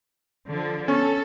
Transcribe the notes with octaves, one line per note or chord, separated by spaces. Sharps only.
D3 F3
B3 C#4 A4 C#6